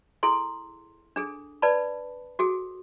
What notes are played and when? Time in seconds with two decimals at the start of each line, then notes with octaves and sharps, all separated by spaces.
0.23 E4 G#4 A4 C6
1.16 D4 G#4 A4
1.62 B4 D5 A5 B5
2.39 F#4 G#4 A4